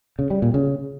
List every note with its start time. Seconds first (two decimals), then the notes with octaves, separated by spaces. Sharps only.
0.19 C#3
0.30 G3
0.42 A#2
0.54 C#3